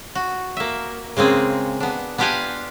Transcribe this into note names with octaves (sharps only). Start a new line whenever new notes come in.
F#4
A#3 E5
C#3 G#3 A#3 C4 G#4
B3 D4
B3 D4 F4 G4 F#5 G#5